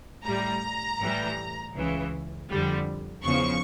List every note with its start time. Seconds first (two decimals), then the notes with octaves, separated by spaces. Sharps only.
0.25 A2 G3 A#5
1.00 A2 E3 G3
1.74 C#2 C#3 E3
2.49 F2 D3 G3
3.24 E2 C#3 F3 C#6